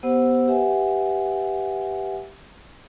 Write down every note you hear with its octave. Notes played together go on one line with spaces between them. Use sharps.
B3 G4 C5 F#5 E6
G4 B4 E5 F#5 G#5